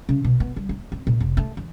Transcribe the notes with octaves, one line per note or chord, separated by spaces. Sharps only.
C#3
B2
B3
G3
A#3
C4
A#2
F1
A3
E3